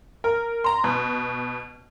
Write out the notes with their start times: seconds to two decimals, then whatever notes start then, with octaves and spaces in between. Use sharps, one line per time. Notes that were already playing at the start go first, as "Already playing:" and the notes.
0.24 A#4
0.64 A#5 C6
0.84 B2